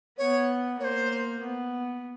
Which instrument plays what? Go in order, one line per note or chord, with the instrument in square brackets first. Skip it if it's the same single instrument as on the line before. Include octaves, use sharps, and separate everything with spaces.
[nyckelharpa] B3 [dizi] C#5
[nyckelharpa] A#3 [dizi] C#5
[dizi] C5
[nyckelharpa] B3